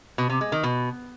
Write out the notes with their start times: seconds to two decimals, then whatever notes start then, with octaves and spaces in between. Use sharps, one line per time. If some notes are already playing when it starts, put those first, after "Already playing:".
0.18 B2
0.30 C3
0.41 G#3
0.52 D#3
0.63 B2